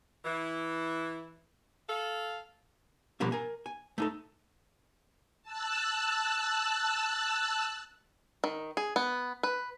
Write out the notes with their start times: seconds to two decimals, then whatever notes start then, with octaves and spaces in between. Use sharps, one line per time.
0.25 E3 E4
1.89 A4 F5
3.20 B2 F3 G3 A#3 D4
3.32 A#4 G#5
3.66 G#5
3.98 A3 D#4 A4
5.43 A5 E6 F#6
8.44 D#3
8.77 G#4
8.96 B3
9.43 B4